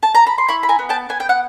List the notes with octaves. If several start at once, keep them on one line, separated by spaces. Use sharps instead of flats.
A5
A#5
B5
C6
E4 B5 C#6
B5
G#5 A#5
B3
G5 A5
B3 G#5
G5
F#5